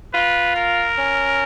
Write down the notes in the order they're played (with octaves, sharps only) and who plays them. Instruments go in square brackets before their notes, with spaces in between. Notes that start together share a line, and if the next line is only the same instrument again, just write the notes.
[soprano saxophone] F4 [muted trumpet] B4
[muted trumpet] A#4
[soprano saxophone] C#4